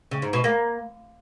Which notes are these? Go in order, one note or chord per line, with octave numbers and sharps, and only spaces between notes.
C#3
G#2
B2
A#3